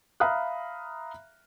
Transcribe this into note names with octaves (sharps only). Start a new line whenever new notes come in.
E5 F5 A#5 B5 D#6 F#6